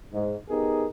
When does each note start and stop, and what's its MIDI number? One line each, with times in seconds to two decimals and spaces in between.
0.13 0.37 44
0.49 0.87 59
0.49 0.87 63
0.49 0.87 67
0.49 0.87 68
0.49 0.87 70